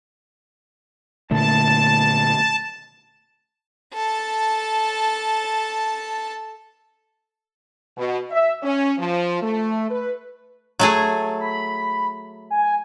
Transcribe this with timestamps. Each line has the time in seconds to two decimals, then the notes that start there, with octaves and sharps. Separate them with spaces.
1.31 A#2 D3 A3 A5
3.94 A4 A5
7.97 B2
8.31 E5
8.63 C#4
8.98 F3
9.42 A3
9.90 B4
10.79 F#3 A3 G#4
11.40 B5
12.50 G#5